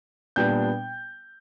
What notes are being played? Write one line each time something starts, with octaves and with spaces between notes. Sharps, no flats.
A#2 G3 B3 D4 G5 G6